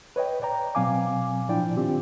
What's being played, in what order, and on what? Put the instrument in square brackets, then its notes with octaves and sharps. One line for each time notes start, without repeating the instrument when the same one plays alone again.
[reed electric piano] B4 C#5 D#5 G5
D5 G5 A#5
B2 F#3 C4 F5 G#5 D6
A#2 F3 D4 E4 D5 G5
D#3 C4 F4 G4